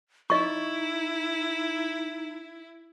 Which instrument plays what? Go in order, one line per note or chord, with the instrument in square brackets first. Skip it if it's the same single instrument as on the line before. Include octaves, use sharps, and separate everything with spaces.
[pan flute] D#4 [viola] E4 [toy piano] D#5 C#6